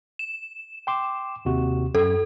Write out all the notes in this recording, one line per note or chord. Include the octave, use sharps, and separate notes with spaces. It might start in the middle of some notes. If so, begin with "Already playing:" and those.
E7
G5 C6 D6
D#2 C3 F#4
F#2 A4